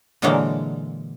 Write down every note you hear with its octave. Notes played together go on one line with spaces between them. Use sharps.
A#2 D3 E3 F#3 G#3 A#3